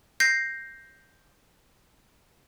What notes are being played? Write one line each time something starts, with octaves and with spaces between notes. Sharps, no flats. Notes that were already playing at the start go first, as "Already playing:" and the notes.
G6 A#6 C7